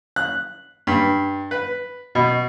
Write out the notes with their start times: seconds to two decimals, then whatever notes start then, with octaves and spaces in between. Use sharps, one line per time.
0.16 F#6
0.87 G2
1.51 B4
2.15 B2